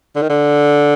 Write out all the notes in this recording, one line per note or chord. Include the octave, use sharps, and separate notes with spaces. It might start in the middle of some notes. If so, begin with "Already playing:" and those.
D3
D#3
D3